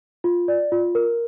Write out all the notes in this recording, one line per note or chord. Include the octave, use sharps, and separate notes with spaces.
F4
D5
F4
A#4